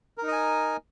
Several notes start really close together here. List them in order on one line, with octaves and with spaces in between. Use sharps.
A#4 D#4 D#5 G#5